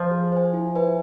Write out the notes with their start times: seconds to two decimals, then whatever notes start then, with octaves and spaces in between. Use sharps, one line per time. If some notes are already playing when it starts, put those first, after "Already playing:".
Already playing: F3
0.11 G#4
0.32 C5 G#5
0.54 E4
0.75 B4 E5 G#5